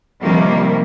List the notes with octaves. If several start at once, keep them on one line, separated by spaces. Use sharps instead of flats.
C3 D#3 F3 G3 A#3